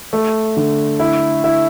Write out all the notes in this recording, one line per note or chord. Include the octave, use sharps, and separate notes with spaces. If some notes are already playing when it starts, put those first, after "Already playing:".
A3
D3
E4
E4